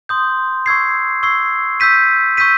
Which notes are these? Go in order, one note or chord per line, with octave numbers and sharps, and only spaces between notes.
C6 D#6 G6
C#6 E6 G#6 C7
C#6 E6 G#6 C7
C#6 E6 G6 B6 D#7
C#6 E6 G6 B6 D#7